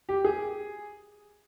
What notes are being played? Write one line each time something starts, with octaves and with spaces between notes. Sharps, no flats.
G4
G#4